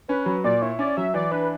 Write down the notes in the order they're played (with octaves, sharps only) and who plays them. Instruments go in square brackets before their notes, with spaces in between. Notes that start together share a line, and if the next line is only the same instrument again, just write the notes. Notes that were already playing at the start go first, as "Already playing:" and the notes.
[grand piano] C#4 [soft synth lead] B4
[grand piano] F#3
[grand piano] A#2 [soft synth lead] D5
[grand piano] E4 [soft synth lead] C#5
[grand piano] C#4 [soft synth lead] D5
[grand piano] F#3 [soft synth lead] E5
[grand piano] E3 [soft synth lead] D5
[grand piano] D4 [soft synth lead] B4